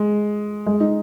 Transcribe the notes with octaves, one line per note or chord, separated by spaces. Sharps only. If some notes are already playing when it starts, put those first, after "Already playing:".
Already playing: G#3
G#3
D#4